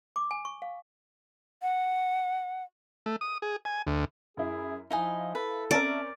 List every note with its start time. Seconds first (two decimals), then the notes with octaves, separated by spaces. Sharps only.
0.16 D6
0.31 G#5
0.45 C#6
0.62 F5
1.62 F#5
3.06 A3
3.21 D#6
3.42 G#4
3.65 G#5
3.87 D2
4.37 F#2 E4 G#4
4.91 F3 D#4 E4 D#5 F5 G#5
5.35 A4 B4
5.71 C4 C#4 A#4 D5 E5 A5 A#5